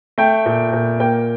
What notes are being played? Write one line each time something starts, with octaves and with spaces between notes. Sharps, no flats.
A3 G5
A#2
A#2
A#3 G5